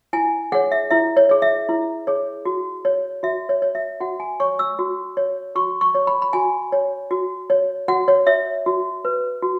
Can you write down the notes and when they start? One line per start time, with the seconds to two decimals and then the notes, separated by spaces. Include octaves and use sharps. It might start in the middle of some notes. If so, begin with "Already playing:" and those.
0.13 E4 G#5
0.52 G#4 C#5 F#5
0.71 E5
0.91 E4 E5
1.17 C#5
1.29 G#4 C#5
1.42 E5
1.69 E4
2.07 G#4 C#5
2.45 F#4
2.85 C#5
3.23 F#4 E5
3.49 C#5
3.62 C#5
3.75 E5
4.01 F#4 F#5
4.20 G#5
4.40 C#5 C#6
4.59 E6
4.79 F#4
5.17 C#5
5.56 F#4 C#6
5.81 C#6
5.95 C#5
6.07 B5
6.22 B5
6.33 F#4 G#5
6.72 C#5
7.11 F#4
7.50 C#5
7.88 F#4 F#5
8.08 C#5
8.27 C#5 E5
8.66 F#4
9.05 B4
9.43 F#4